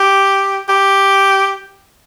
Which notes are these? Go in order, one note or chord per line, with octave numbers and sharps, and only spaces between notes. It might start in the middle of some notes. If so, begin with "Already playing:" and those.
Already playing: G4
G4